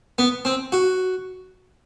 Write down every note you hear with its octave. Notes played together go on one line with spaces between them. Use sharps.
B3
C4
F#4